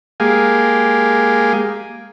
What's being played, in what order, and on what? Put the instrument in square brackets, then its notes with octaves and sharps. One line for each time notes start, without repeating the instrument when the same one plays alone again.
[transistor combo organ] G#3 A#3 G4 G#4 F5